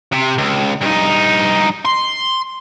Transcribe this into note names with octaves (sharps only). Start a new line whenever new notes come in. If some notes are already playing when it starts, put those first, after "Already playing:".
C3
C#2
G2 D#4
C6